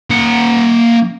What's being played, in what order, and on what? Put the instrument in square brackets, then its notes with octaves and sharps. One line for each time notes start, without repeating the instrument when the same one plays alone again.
[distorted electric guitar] A#3 F#5